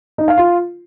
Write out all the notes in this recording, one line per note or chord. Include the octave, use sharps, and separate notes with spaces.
D#4
F5
F4